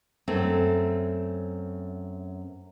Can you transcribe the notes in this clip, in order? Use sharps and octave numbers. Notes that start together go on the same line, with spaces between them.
F#2 A3 C4